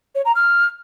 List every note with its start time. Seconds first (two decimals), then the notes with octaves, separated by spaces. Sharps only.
0.15 C#5
0.25 A#5
0.35 F6